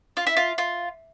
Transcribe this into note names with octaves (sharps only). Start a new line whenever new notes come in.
F4
E4
F4
F4